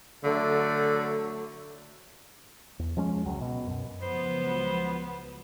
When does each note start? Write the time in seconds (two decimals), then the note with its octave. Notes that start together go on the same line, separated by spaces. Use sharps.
0.24 D3 F#3 A3
2.79 E2
2.97 F3 G#3 C#4
3.26 C#2 F#3
3.41 B2
3.67 F#2
4.02 C#2 F3 F#3 B3 C5